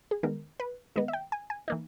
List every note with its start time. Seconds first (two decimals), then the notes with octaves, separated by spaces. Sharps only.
0.11 G#4
0.23 D#3 G#3 B3 A#4
0.60 B4
0.96 D#3 G#3 B3 D#5
1.08 E5
1.13 G5
1.32 G#5
1.50 G#5
1.68 E3 A#3 D#4